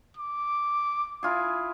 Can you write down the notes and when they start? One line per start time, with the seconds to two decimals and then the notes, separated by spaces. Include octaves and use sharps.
0.17 D6
1.23 E4 F4 G#4